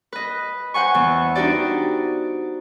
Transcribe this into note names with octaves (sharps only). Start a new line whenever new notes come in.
B4 D#5
C5 F#5 G#5 C#6
E2 E3
D4 D#4 F#4 G4 D5